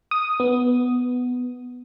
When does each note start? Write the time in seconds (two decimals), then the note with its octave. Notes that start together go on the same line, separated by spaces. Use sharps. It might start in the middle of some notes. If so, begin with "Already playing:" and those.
0.11 D#6
0.40 B3